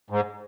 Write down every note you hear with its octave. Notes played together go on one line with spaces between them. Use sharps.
G#2